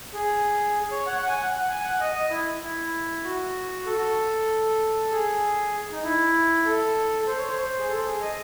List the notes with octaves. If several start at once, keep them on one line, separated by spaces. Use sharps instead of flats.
G#4
C#5
F#5
F#5
G#5
F#5
F#5
G#5
F#5
D#5
D#5
E4
E4
F#4
A4
G#4
D#4
E4
A4
A4
C5
C#5
C5
C5
G#4
A4
G#4
D#5